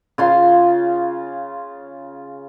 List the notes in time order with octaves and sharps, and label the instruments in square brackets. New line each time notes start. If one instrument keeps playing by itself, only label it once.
[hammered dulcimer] C#3 F4 C6